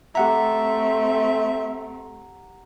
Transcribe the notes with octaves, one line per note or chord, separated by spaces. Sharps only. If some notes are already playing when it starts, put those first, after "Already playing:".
A3 C4 G4 E5 F#5 A#5